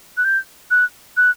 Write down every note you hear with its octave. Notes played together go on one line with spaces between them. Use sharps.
F#6
G6
F#6
F#6